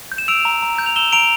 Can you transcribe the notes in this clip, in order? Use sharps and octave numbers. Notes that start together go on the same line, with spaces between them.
G6
E7
E6 D7 F7
A#5
A#5
G6
F7
E6 E7 G7
A#5 D7 F7